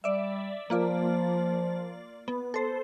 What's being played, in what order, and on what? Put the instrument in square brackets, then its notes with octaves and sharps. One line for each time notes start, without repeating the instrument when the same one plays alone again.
[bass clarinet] G3 [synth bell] D5 E5
[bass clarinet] F3 [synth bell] A#3 F4 D5
[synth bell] B3
A4 C5